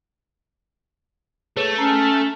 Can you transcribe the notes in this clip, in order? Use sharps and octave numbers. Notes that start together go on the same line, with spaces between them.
A3 G#4 B4 C#5
C#4 A4 A#5 C7